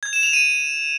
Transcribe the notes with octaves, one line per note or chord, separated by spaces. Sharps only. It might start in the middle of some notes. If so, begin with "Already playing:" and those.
G#6
E7
F7
D#7